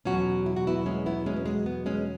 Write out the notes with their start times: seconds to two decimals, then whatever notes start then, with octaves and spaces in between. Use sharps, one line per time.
0.05 E2 B2 F#3 C#4 F#4
0.46 E4
0.56 F#4
0.67 B3 E4
0.86 G#3 C#4
1.06 B3 E4
1.26 G#3 C#4
1.36 B3
1.46 G#3
1.66 B3
1.86 G#3 C#4